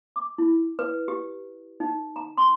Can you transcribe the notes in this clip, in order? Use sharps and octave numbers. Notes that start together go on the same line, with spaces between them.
D6
E4
B4
G4
D#4
A#5
C6